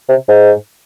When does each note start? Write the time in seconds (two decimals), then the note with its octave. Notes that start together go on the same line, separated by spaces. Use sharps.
0.09 C3
0.28 G#2